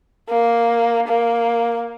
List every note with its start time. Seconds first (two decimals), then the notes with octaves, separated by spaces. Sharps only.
0.29 A#3
1.08 A#3